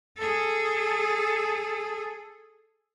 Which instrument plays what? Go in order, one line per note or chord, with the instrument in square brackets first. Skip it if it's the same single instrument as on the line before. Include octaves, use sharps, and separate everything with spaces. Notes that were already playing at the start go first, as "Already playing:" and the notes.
[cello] G#4 A4